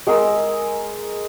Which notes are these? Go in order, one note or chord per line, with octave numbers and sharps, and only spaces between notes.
G#3 G#4 A#4 E6